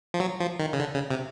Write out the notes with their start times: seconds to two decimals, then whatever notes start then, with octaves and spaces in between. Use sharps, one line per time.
0.14 F3
0.20 F#3
0.40 F3
0.59 D#3
0.73 C#3
0.80 D3
0.94 C#3
1.11 C3